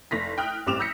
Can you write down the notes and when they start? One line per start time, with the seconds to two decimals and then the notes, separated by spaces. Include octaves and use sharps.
0.11 F1 A#6 B6
0.38 G5 D#6 F6 F#6
0.66 A1 G3 C4 D6 E7 F7
0.79 D#6 E6 G6 A#6 B6 C#7